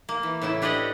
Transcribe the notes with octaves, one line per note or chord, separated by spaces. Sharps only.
A#3
E3
A2 C#3 E4 E5
D4 G4 B4 D5 D#5 F#5